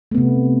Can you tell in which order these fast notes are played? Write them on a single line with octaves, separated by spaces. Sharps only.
A3 B3 C3